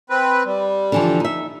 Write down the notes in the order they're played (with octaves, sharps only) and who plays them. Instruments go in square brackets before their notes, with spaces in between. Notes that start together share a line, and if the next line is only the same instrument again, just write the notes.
[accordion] C4 B4
G3
[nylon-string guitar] D3 E3 F3
D#4 E5